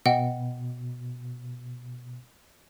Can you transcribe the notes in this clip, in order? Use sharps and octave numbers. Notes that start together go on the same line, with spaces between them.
B2 D#5 F#5 G5